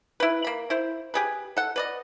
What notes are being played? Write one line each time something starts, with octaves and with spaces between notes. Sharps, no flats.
E4 B4
A#3 B5
E4 C5
G4 G#4 B4
A4 F#5
B4 D5 D#5